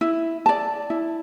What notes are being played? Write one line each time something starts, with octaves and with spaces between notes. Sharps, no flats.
E4
D5 A5
E4